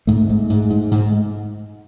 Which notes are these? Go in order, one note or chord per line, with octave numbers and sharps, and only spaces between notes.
G#2 A3
G#2
G#2
G#2
G#2